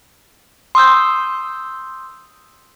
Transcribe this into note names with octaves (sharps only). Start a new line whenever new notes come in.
C6 D#6 E6 G6